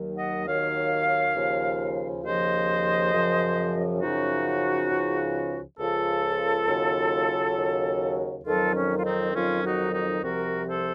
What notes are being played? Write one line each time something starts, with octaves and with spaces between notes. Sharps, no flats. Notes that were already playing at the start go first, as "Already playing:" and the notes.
Already playing: D#2 D#3 F#3
D#5 F#5
D#2 D#3 F#3 C#5 F5
D#2 C#3 F3
D#2 C#3 F3 C5 D#5
F#2 C#3 F3
F#2 C#3 F3 D#4 F#4
C#2 C#3 F3
C#2 C#3 F3 F4 A4
D#2 C#3 F#3
D#2 C#3 F#3
F2 D#3 F#3 F4 A4
C#4
F4
C4 D#4
F2 D#3 F#3 C#4 F4
D#4 F#4
D#4 F#4
C2 C3 F3 F#4 A#4
A4 C5